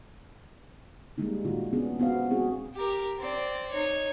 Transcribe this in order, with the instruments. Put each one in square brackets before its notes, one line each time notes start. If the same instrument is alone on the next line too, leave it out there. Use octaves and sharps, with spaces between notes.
[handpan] G3 G#3 A#3 D#4
A#2 D#3 F4 F#4
B3 C#4 D4 G#4
B3 F#4 C5 F5
G#3 C4 F#4 G#4
[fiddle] G4 A#4
C4 D5
D#4 C#5